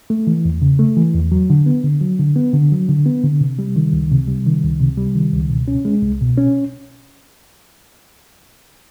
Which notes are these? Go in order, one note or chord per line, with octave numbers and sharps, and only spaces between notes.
A3
E3
E2
C#3
A3
E3
E2
F#3
D3
B3
D3
F#3
D3
B3
D3
F#3
D3
B3
D3
C3
G3
D#3
C#2
C3
G3
D#3
C#2
C3
G3
D#3
C#2
B2
C#4
G#3
C2
B2
C#4